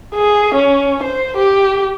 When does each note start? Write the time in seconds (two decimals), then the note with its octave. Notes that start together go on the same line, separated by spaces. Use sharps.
0.15 G#4
0.55 C#4
1.03 C5
1.37 G4